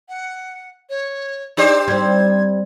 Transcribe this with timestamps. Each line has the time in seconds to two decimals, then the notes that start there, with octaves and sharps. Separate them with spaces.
0.09 F#5
0.89 C#5
1.57 D4 G4 C5 D5
1.88 G3 C4 G#6